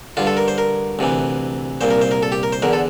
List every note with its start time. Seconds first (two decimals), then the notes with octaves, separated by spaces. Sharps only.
0.17 G2 D3 F4
0.27 A4
0.37 A#4
0.48 C5
0.58 A#4
0.99 D2 C3 E3
1.81 C2 A#2 C5
1.91 A#4
2.01 C5
2.11 A#4
2.23 A4
2.32 G4
2.43 A#4
2.53 C5
2.62 E2 D3 A#4
2.73 A4